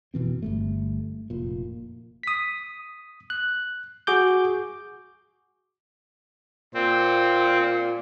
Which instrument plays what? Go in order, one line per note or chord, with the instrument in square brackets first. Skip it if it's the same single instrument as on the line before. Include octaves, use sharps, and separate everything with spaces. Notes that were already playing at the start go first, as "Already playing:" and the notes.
[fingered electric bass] F#1 B2 E3 C4
G1 G2 A3
F1 A#2
[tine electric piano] D#6 B6
F#6
F#4 G#4 D6 G6
[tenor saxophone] A#2 [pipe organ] C4